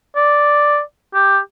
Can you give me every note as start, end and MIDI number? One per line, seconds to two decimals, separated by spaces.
0.16 0.80 74
1.14 1.39 67